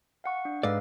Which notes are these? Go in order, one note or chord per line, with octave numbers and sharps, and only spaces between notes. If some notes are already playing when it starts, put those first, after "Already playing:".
F5 F#5 C#6
D4
G#2 A4 B4 D5 F5